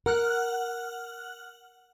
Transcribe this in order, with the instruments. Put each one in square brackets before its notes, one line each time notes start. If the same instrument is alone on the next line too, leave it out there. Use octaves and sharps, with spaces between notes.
[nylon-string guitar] A#4 [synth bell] F#5 F6 F#6